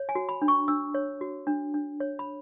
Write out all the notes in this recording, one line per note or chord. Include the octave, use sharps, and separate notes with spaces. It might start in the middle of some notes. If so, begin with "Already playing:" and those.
Already playing: C#5
G#5
F#4
B5
D4
C#6
D4 E6
C#5
F#4
D4
D4
C#5
B5